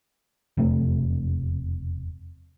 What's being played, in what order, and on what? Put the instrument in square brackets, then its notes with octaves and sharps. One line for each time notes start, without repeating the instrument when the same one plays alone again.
[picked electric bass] E1 F2 C3 A3